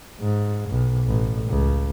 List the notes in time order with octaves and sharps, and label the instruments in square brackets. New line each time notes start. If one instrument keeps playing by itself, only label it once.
[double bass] G#2
B1
A1
C#2